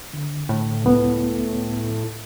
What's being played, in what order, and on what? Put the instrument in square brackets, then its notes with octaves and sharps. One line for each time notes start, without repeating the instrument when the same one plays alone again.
[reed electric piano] D3
[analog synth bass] A2
[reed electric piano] C#2 B3